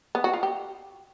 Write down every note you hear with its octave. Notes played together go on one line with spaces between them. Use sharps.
B3
F#4
F4
G4